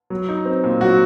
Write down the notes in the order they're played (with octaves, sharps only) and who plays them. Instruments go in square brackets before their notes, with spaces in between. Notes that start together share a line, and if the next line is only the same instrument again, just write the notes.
[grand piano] F#3
D#4
C4
A#2
F#3 F#4